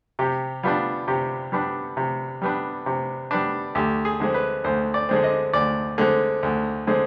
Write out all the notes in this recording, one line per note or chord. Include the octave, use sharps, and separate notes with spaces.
C3 G4
G3 B3 D4 F4
C3 G4
G3 B3 D4
C3
G3 B3 D4
C3
G3 B3 D4
D2 G4
G#4
D3 G#3 C4
B4
D2 C5
D5
D3 G#3 C4
D#5
D2 D5
D3 G#3 C4
D2
D3 G#3 C4